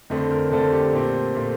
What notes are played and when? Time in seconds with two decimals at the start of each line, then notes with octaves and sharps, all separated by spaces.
0.10 F2 D3 A3 C4
0.32 A#4
0.51 F2 D3 A3 C4 A4
0.72 G4
0.93 A#2 A3 C4 G4
1.35 A#2 A3 C4